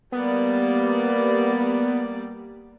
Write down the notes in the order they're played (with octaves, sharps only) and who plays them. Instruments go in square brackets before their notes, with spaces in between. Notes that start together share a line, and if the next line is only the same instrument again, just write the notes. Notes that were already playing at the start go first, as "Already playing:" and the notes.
[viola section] G3 A#3 D5 [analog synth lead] B3